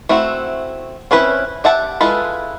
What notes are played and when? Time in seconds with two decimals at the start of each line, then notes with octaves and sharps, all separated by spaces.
0.09 A3 C4 E4 F#4
1.11 C4 C#4 E4 B4 C#5
1.64 G4 E5 F#5 A5
2.01 G#3 E4 F4 A4 B4